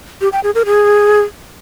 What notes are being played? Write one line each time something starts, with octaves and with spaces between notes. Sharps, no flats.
G4
G5
G#4
A#4
G#4